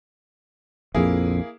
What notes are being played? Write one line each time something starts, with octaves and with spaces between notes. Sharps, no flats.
A#1 F2 A#3 E4 G#4